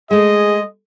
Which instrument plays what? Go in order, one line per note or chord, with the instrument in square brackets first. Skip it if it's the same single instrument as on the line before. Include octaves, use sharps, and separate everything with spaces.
[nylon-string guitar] G#3 A3 [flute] G#4 [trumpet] D#5